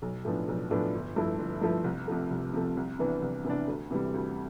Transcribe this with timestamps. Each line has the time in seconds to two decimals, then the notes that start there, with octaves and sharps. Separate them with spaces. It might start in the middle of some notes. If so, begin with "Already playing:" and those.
0.02 B1
0.25 A2 F3 B3 D4
0.48 B1
0.71 A2 F3 B3 D4
0.94 G1
1.16 G2 F3 A3 E4
1.39 G1
1.61 G2 F3 A3 E4
1.84 C2
2.08 C3 F3 A3
2.31 C2
2.54 C3 F3 A3
2.77 C2
2.99 C3 E3 B3 D4
3.22 C2
3.45 C3 E3 B3 D4
3.68 D2
3.91 C3 E3 G3
4.14 D2